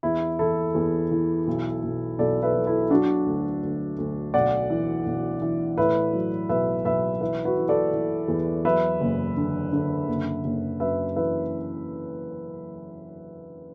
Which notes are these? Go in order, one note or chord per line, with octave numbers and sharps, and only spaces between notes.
E2 E4
E3 E4 A4
E2
E3
B1
B1
B1 A4 D5
B4 E5
F#3
E4 A4
F#3 D4 F#4
D2
D2
D2
B1 D5 F#5
E3
B1
E3
A2 B4 E5
F#3
B1 B4 E5
B1 B4 E5
E3 B4 E5
F#4 B4
E3
A4 D5
E3
E2
F#3 B4 E5
F#1
D3
D3
F#1
F#1
F#2 B4 E5
E3 B4 E5